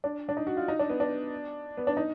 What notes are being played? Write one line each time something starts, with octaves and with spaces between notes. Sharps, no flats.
D4
D4
D#4
F#4
F4
D#4
D4
B3
D4
B3
D4
D#4